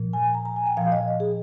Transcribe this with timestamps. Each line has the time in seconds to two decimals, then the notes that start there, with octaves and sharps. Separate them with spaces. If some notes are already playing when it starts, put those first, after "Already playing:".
Already playing: A#2 F3
0.13 G#5
0.34 A#5
0.45 A#5
0.56 G#5
0.66 G5
0.77 A#2 F3 F5
0.92 D#5
1.20 G#4